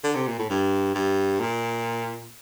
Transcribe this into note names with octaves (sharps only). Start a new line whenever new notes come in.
D3
C3
A#2
A2
G2
G2
A#2